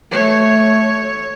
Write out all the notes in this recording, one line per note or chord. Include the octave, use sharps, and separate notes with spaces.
A3 C#5